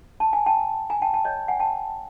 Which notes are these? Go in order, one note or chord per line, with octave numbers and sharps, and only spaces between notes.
A5
G#5
G5 A5
G#5 A#5
G5 A5
G5 A5
C#5 D#5
F#5 G#5
G5 A5